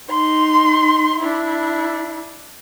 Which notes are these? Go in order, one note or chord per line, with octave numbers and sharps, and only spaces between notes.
D#4 C6
D4 E4